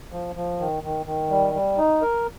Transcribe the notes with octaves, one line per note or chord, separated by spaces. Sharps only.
F3
F3
D#3
D#3
D#3
G3
G3
D#4
A#4